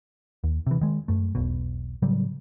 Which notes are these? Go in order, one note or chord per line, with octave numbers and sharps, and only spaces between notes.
D#2
C3 E3
D#3 G#3
F#2 A3
E1 B1 B2
A2 C#3 F#3 G3